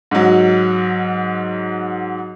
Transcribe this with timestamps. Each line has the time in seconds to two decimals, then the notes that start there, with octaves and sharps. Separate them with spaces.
0.11 G#2 F#3